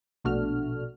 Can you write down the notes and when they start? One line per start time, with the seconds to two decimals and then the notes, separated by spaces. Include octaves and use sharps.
0.24 A#1 B2 A3 D4 F#4 F6